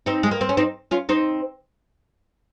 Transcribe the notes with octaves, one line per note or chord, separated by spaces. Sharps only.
C4 D#4
G#3
A#3
C4
C#4
C4 D#4
C#4 F4
C4 D#4